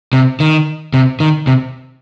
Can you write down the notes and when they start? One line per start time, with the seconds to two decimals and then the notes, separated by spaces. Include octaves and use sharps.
0.13 C3
0.40 D#3
0.94 C3
1.20 D#3
1.47 C3